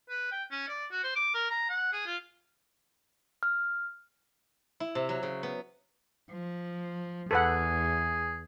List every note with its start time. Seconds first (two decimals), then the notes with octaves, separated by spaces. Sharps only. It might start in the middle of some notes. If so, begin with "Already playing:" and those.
0.09 B4
0.32 G5
0.51 C#4
0.68 D5
0.92 F#4
1.03 C5
1.16 D6
1.34 A#4
1.50 A#5
1.70 F#5
1.93 G#4
2.06 F4
3.43 F6
4.80 E4
4.95 C3
5.09 F#3
5.23 C#3
5.43 B3
6.31 F3
7.31 E2 G#4 A4 B4 F#5